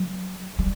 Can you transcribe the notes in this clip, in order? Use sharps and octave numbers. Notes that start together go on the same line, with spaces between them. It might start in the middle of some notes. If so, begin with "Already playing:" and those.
Already playing: F#3
G3